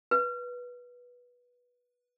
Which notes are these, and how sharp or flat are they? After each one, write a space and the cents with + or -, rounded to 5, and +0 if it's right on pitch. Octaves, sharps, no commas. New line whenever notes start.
B4 -15